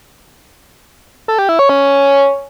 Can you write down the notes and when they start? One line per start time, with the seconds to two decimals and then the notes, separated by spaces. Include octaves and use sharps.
1.28 A4
1.39 G4
1.49 E4
1.59 C#5
1.69 C#4